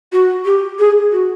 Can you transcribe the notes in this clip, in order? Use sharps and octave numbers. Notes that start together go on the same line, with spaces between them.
F#4
G4
G#4
F#4